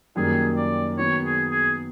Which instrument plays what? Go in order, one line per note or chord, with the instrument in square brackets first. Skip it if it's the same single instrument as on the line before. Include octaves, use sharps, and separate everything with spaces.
[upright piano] F#2 D#3 G3 A#3 [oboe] G#4
[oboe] D5
[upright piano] D#3 F#3 B3 [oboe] C#5
[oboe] G#4
G#4